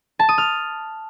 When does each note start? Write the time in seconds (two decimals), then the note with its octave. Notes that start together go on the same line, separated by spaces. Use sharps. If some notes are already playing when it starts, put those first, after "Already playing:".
0.19 A5
0.29 D#6
0.38 F6